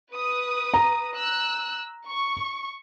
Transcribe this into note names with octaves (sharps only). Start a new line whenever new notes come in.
B4 D#6
A#5
E6 F#6
C#6